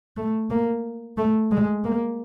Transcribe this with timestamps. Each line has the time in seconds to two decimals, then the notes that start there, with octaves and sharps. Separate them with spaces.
0.17 A3
0.50 A#3
1.18 A3
1.51 G#3
1.84 A#3